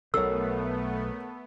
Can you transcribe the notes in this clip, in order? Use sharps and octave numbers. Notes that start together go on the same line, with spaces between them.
B1 B2 A3 B3 A4 A#4 C#5 E6